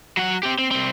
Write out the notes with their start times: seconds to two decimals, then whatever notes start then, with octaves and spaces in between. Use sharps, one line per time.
0.17 F#3 F#5
0.43 C4 G4
0.59 C4
0.71 C2 C4